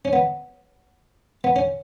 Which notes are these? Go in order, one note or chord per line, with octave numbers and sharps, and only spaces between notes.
C#4
B3
B3
C#4